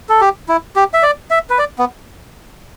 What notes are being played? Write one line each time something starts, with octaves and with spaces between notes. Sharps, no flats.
A4
G4
E4
G4
E5
D5
E5
B4
D5
B3